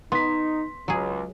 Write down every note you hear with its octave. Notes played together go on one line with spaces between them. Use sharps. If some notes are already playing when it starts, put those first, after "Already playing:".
B3 D#4 C6 B6
C#2 F#3 G#4